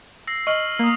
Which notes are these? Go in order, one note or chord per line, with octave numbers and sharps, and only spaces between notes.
E6 A#6 C7
D#5 C#6 F6 F#7
A#3 D#6 C7